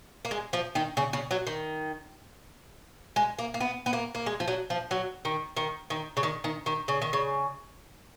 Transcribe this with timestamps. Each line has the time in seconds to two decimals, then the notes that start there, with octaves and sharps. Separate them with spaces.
0.25 A#3
0.31 G#3
0.53 F3
0.75 D#3
0.97 C#3
1.13 C#3
1.31 F#3
1.47 D#3
3.16 G#3
3.39 A#3
3.54 A#3
3.60 B3
3.86 B3
3.93 A#3
4.15 A#3
4.26 G#3
4.40 F3
4.48 F#3
4.70 F3
4.91 F#3
5.25 D#3
5.57 D#3
5.90 D#3
6.17 C#3
6.23 D#3
6.44 D#3
6.66 D#3
6.88 C#3
7.02 D#3
7.13 C#3